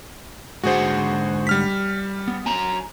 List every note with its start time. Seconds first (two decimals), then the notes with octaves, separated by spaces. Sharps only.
0.64 G#2 D3 F#4 G#4 C5 F#5
1.47 G3 F6 B6
2.28 B3
2.46 F#3 G#5 A#5